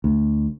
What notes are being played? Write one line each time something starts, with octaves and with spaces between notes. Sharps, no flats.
D2